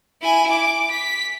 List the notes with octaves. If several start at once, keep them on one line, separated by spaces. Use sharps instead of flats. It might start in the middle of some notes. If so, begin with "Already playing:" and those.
E4 G#5
D6
B6